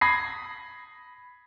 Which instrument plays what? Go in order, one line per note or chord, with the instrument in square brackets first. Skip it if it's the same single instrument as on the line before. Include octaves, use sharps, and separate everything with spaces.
[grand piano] B5 D#6 G#6 A#6 C7